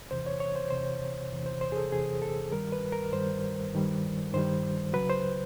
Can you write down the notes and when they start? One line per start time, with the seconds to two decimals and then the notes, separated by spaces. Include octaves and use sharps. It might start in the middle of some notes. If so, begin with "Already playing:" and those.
0.11 E2 C3 E3 C5
0.26 C#5
0.40 C#5
0.56 C5
0.71 E2 C3 E3 C5
1.31 E2 C3 E3
1.46 C5
1.61 C5
1.72 G#4
1.77 A4
1.92 E2 C3 E3 G#4
2.22 A4
2.52 G2 D#3 G3 A#4
2.72 B4
2.92 A#4
3.13 G2 D#3 G3 C5
3.73 G2 D#3 G3
4.34 G2 D#3 G3 C5
4.93 C#2 C#3 F#3 B4
5.09 C5